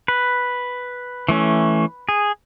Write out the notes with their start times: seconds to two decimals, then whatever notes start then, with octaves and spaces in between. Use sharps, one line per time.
0.08 B4
1.29 E3 A3 C#4
2.09 G#4